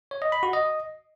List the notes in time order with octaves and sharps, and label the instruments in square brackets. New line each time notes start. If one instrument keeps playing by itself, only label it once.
[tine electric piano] C#5
D#5
B5
F#4
D#5